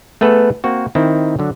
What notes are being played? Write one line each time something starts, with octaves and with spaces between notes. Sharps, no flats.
A3 B3 G#4 A4 B4
A#3 C4 F#4
D#3 C4 D#4 E4
D3 F#3